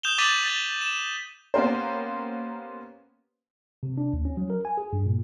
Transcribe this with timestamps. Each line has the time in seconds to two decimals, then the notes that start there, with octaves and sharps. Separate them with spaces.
0.03 D#6 G6 E7 F7 G7
0.18 D6 A6 B6 D#7 F7 F#7
0.44 D6 A6 G7
0.81 E7
1.54 A#3 B3 C#4 G4 A#4 C5
3.83 C3
3.98 D4
4.13 D#2
4.25 C#4
4.37 F#3
4.50 A#4
4.65 G#5
4.77 G#4
4.93 G2
5.06 A#2